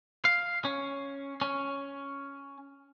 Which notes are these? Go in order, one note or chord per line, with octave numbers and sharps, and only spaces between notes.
F5
C#4
C#4